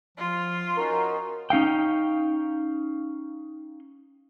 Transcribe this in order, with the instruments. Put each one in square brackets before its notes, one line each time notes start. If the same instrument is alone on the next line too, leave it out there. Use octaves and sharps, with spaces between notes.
[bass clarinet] F3 [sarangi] F4
[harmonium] C#4 D#4 F#4 [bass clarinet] A#4
[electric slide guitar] C#4 D#4 F5 G5